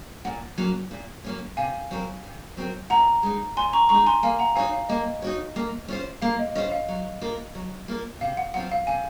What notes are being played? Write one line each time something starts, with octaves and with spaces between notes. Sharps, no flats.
A#2 F#5
F#3 A#3 C#4
A#2
F#3 A#3 C#4
C3 F5 G#5
F#3 C4 F#4 A#4
C3
F#3 C4 F#4 A#4
A#2 F#5 A#5
G#3 D#4
A#2 G#5 C6
A#5 C#6
G#3 A#5 C#6
D#4
G#5 C6
A#3 F5 G#5
F#5 A#5
D#4 F#4 C#5 F5 G#5
F5
A#3 D#5
D#4 F#4 C#5
A#3
C#4 F4 C5
A#3 F5
D#5
C#4 F4 C5 D#5
F5
F#3
A#3 F4 A#4
F#3
A#3 F4 A#4
C3 F5
F#5
F#3 C4 F4 F#5
F5
C3 F5 G#5